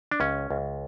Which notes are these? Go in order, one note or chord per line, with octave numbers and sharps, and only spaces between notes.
D4
C#2 C#4
C#2